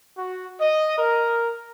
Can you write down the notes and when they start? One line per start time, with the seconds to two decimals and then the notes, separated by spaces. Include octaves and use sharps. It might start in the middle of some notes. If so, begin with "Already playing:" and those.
0.17 F#4
0.59 D#5
0.98 A#4